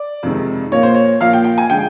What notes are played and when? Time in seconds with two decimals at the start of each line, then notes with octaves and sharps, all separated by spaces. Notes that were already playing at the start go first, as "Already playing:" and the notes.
Already playing: D5
0.23 F2 C3 D#3 G#3
0.72 A#2 F3 A#3 C#5
0.83 C5
0.95 C#5
1.20 A#2 F3 A#3 F5
1.33 G5
1.44 G5
1.58 G#5
1.70 D3 F3 G#3 G5